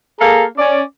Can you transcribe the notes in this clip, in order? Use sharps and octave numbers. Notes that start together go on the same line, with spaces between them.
A#3 G#4 A4 F5 A#5
C#4 D5